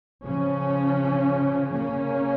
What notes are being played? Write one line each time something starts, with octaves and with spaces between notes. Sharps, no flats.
C#3 F3 C#4
C#3 A#3 C#4